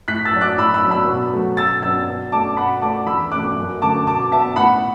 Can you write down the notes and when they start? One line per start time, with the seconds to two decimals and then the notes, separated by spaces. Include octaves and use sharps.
0.08 A2 F#6 B6
0.25 E6 A6
0.33 F#3 D4
0.41 D6 F#6
0.58 A2 B5 E6
0.74 B5 E6
0.83 F#3 B3 D4
0.91 B5 E6
1.07 B2
1.33 F#3 A3
1.57 B2 E6 A6
1.82 F#3 B3 D4 E6 A6
2.07 B2
2.32 A3 D4 A5 D6
2.57 B2 F#5 B5
2.82 A3 D4 A5 D6
3.07 E2 B5 E6
3.32 B2 A3 D4 D6 F#6
3.57 F#2
3.82 D3 F#3 A3 A5 D6
4.07 B2 A5 D6
4.31 B3 D4 E5 A5
4.56 A2 F#5 B5